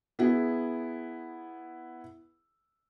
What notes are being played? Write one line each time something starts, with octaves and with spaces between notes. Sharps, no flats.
B3 E4 G#4